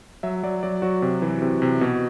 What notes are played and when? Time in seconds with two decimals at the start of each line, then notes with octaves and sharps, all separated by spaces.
0.23 F#3 E5
0.43 F#3 D5
0.63 F#3 D5
0.82 F#3 F#4
1.02 C3
1.22 E3
1.42 C3
1.62 C3
1.81 B2